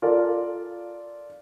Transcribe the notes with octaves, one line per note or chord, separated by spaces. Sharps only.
F4 A4 A#4 D5 F5